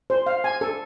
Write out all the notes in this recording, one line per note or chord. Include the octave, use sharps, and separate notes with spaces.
C5
F5
G#5
A4